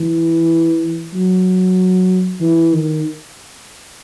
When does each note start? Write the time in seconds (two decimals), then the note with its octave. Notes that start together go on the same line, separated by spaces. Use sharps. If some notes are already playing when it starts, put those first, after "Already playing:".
Already playing: E3
1.14 F#3
2.41 E3
2.73 D#3